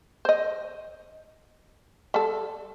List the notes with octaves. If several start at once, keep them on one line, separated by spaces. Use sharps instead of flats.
C5 D#5
G3 A4